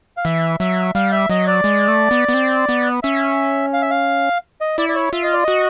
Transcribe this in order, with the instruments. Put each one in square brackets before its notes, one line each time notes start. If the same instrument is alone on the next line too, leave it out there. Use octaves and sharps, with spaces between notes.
[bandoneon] F5
[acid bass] E3 [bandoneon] E5
[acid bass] F#3 [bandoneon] E5
[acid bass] G3 [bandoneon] F5
[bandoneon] E5
[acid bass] F#3 [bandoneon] D#5
[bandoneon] D5
[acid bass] G#3
A3
B3
B3
C4
B3
[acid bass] C#4 [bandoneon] E5
[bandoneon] F5
E5
F5
D#5
[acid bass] E4 [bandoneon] D5
[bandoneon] D5
C#5
[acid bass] F4 [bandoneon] E5
[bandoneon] D#5
D5
[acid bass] F#4 [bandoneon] D#5